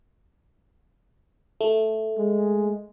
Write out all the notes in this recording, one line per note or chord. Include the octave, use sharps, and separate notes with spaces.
A3
G#3